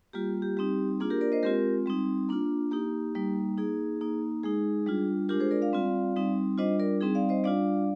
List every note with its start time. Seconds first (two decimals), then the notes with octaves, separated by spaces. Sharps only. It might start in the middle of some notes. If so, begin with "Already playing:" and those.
0.13 G3 A#3 F4 G4
0.42 G4
0.57 G3 C4 D#4 G4
1.00 A#3 D4 F4 G#4
1.10 G4 A#4
1.21 A#4 D5
1.32 C5 D#5
1.42 G#3 C4 F4 G4 A#4
1.86 G3 C4 D#4
2.29 A#3 D4 F4
2.71 A#3 D#4 G4
3.15 G3 A#3 D#4
3.58 A#3 D#4 G#4
4.01 A#3 D#4
4.43 G#3 D#4 G#4
4.86 G3 D4 F4
5.29 G#3 D4 F4 G4 A#4
5.40 G#4 C5
5.51 A#4 D5
5.62 D5 F5
5.72 G3 C4 F4
6.16 G3 C4 D#4
6.58 G3 D4 F4 C5 D#5
6.79 A#4 D5
7.00 G3 C4 D#4 G#4
7.15 D5 F5
7.29 C5 D#5
7.44 G3 D4 F4 D5 F5